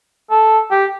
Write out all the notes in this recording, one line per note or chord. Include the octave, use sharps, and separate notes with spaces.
A4
G4